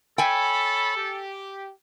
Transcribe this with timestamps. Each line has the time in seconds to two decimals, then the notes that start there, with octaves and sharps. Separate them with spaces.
0.18 A4 C#5 G5 G#5 B5
0.96 G4